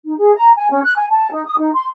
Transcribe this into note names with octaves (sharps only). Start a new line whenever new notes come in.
D#4
G#4
A#5
G#5
C#4
F#6
G#5
A5
D#4
D#6
D#4
C6